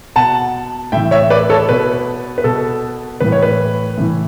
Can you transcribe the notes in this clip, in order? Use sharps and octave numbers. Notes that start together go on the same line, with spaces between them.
B2 F#5 A5
A2 E3 E5 G5
C#5 E5
B4 D5
A4 C#5
B2 B4
B4
B2 A4
A2 E3 B4
C#5
B4
A2 E3